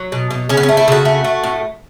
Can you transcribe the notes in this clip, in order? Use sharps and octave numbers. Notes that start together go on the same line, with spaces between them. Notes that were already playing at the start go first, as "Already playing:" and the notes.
Already playing: F#3
B2
B2
C#3 C#4
B3
C#4
A3
E4
C#3 F#4
A3
A3
A2